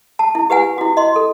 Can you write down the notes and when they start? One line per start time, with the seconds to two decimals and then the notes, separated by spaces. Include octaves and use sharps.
0.19 A5
0.35 E4
0.50 G4 B4 F#5 G#5
0.78 E4 F#4
0.97 D#5 C6
1.16 A4